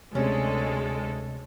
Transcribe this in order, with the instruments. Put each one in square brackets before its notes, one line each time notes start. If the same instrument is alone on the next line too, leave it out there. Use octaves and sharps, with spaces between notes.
[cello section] D2 A4 [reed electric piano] C3 [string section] G#3 [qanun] C#4